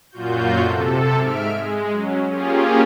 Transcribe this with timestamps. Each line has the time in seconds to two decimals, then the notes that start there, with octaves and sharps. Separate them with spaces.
0.11 F#2 A#2 F4 F#4 G6
0.60 C3 A4
1.18 G#2 E5 F6 D7
1.48 G#3
1.92 F#3 C#4
2.28 A#3 C#4 F4 G4 G#4